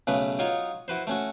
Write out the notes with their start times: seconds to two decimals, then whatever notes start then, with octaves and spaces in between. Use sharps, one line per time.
0.07 B1 C#3 A3 B4
0.39 F#3 D#4 F4 C#5 D#5
0.88 E4 F#4 B4 C5
1.07 A3 C#4 F#4